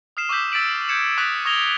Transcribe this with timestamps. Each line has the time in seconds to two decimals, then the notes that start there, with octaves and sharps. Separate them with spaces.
0.17 D#6 F6 C7 E7
0.29 C#6 D6 E6 G6 B6
0.52 E6 A6 B6 D7 F#7
0.89 G6 G#6 C#7 E7
1.17 C#6 D#6 E6 F#6 A6 B6
1.45 C#6 D#6 G#6 A#6 F7 G7